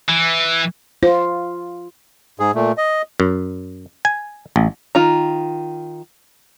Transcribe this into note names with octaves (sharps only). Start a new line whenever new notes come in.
E3
F4 C5
G#2 G#4
A#2 A3
D#5
F#2
G#5
A1
D#3 F4 A#5